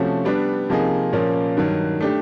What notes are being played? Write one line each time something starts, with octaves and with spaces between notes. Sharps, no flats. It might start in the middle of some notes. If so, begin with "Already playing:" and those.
Already playing: C3 F3 A3 C#4 F#4
G3 B3 D4
C3 F3 A#3 D#4 G#4
A#2 F3 A#3 C#4
G2 D#3 F#3
A3 D4 G4